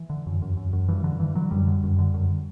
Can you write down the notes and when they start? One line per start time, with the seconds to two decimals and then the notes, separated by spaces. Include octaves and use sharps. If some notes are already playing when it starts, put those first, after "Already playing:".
Already playing: E3
0.10 D3
0.26 F#2
0.42 F#2
0.57 F#2
0.73 F#2
0.88 G2 E3
1.04 G2 D3
1.20 G2 E3
1.35 D3 F#3
1.51 F#2 G3
1.67 D3
1.83 F#2
1.99 D3
2.14 F#2